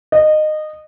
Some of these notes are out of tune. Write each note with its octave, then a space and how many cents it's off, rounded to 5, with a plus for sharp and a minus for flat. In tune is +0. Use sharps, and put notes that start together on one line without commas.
D#5 -20